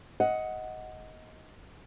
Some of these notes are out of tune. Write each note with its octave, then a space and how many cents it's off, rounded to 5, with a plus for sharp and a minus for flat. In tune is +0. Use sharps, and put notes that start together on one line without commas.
D#5 +15 F#5 +0